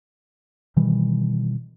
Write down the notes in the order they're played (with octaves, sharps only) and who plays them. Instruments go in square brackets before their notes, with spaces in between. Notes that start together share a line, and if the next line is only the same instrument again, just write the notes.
[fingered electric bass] B2 D#3 E3 G3